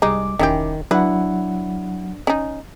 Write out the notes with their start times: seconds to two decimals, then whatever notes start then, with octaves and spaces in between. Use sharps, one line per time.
0.02 C2 G3 G#3 D#4 D6
0.39 E1 D#3 C#4 E4 G4
0.91 F#3 D4 E4 B4 F#5
2.27 C#4 D#4